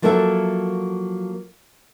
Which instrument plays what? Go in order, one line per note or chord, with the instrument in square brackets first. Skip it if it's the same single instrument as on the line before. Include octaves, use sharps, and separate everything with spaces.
[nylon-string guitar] F3 F#3 A#3 A4 C5 E5